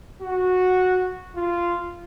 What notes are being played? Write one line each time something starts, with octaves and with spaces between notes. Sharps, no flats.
F#4
F4